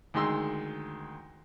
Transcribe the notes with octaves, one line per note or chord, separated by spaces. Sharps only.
D2 D#3 G#3 C6 E6